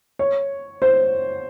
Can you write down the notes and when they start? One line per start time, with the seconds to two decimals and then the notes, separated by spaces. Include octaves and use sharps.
0.19 C#5
0.82 C5